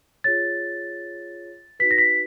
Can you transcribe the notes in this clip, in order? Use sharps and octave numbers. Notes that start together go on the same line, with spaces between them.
F4 G#4 C#5 A6
D#4 F#4 B4 B6
A#6
B6